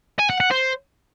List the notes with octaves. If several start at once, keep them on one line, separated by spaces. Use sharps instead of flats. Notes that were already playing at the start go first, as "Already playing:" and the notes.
G#5
F#5
F#5
C5